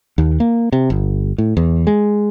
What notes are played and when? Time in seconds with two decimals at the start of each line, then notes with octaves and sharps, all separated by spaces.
0.18 D#2
0.40 A#3
0.72 C3
0.90 G1
1.38 A2
1.57 E2
1.87 G#3